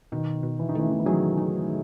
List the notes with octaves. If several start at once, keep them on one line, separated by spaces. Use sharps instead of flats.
B2 D#3
B2
E3
D#3
C#3 E3 A3
D#3
E3
D#3 F#3 G#4
D#4